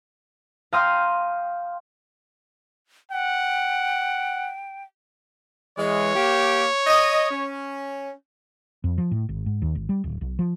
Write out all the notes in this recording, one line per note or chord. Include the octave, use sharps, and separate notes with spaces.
F5 G5 A#5 C6 D#6 F6
F#5 G5
E3 G#3 C#5
A#3 G4
D#5
C#4
F2
F3
A2
G#1
G#2
D#2
G#1
G3
D1
B1
F3